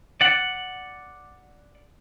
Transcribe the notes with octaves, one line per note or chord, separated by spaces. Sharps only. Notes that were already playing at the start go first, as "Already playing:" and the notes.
D5 F#5